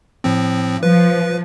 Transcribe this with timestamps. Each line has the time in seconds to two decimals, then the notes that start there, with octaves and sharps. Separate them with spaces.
0.24 A2 F3 C4
0.83 F3 B4